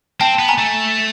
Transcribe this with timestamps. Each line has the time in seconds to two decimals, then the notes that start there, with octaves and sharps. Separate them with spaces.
0.20 C4 G5 A5
0.39 B3
0.48 G#5 A#5
0.58 A3